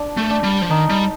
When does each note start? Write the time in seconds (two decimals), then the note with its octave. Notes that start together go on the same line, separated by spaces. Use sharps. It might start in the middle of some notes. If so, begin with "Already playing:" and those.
Already playing: D4
0.17 A3
0.30 D4
0.43 G3
0.62 F3
0.69 D#3 D#4
0.90 G3